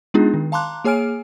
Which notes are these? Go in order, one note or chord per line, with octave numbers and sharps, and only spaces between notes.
G#3 B3 D4 D#4 F4 G#4
D#3
F5 A5 A#5 C6 D6 F#6
A#3 G#4 C#5 G#5 F6 D7